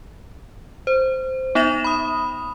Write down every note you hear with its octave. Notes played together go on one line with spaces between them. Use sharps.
C5
B3 D#4 E5 A#6 E7 F7
B5 D#6